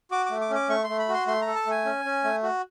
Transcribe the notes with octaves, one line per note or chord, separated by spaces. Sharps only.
F#4 D6
A3 D6
D6
C#4
D6
A3 C#6
C6
A3
B5
F#4 C6
A3 C6
A#5
A4
A5
A3 G#5
C#4
C#4
A3
F#4